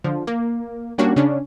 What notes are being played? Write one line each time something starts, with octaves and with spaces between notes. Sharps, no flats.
D3 F3
A#3
G3 A#3 C#4 D4 F#4
C#3 C#4 D4